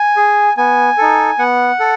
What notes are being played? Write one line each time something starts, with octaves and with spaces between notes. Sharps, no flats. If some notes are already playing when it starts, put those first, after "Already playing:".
Already playing: G#5
G#4
B3 G#5
D#4 A4
B3 F#5
A4